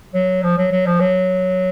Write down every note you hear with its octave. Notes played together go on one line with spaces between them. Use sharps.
F#3
F3
F#3
F#3
F3
F#3